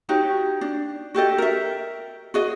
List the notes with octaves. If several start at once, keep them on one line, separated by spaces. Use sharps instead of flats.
D#4 F#4 G4 C#5
D4
F#4 G4 A4 D#5
A#4 E5
F#4 G#4 D#5